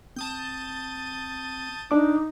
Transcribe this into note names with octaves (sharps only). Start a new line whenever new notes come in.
C4 A5 D#6 G6
D4 D#4 D6